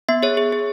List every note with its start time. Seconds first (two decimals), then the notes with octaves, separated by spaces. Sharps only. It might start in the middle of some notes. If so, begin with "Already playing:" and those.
0.09 B3 E5
0.23 G#4 C#5
0.37 G#4
0.52 G#4